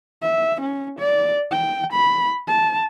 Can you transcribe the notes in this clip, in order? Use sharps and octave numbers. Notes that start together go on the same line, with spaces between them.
E5
C#4
D5
G5
B5
A5